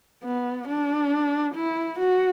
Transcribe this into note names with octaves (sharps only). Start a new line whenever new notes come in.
B3
D4
E4
F#4